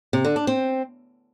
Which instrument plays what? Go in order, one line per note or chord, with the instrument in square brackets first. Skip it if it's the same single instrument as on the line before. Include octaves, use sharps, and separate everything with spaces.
[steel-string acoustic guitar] C3
D3
D4
C4